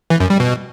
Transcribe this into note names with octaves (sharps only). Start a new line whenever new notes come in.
E3
F#2
G3
B2